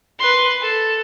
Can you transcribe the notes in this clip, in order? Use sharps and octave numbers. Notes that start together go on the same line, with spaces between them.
B4 C6
A4